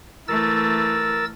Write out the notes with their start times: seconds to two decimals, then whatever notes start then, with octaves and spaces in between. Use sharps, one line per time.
0.28 E3 A3 A#4 E6 A6